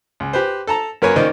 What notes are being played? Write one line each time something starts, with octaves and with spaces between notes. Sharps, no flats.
C#2
G4 B4 C5
A4 A5 A#5
F#2 A#3 A#4 B4 C#5 G#5
D#3 A#3 C#4 C5 D5 D#5